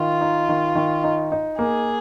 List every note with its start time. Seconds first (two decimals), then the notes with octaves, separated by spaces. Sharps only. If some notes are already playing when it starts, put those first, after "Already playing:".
Already playing: D#3 F4
0.21 D#4
0.49 D#3
0.75 D#3
1.04 D#4
1.32 D#4
1.59 A#3 G#4